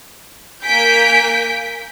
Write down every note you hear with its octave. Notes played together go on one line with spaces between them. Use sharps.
A#3 G#5 G6 B6 D7